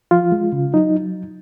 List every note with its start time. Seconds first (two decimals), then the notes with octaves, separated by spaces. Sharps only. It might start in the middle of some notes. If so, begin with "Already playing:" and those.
0.11 F3 F4
0.32 G#3
0.53 C#3
0.73 F#3 D#4